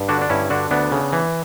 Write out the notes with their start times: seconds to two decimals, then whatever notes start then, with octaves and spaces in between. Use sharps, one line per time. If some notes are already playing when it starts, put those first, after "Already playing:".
Already playing: G2
0.09 D3 D4 F#4
0.21 D4
0.30 G2 C#4 E4
0.50 D3 D4 F#4
0.71 D2 B3 D4
0.92 C#3
1.13 E3